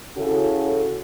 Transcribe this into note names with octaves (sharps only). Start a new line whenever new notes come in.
C#3 C#4 E4 F#4 A4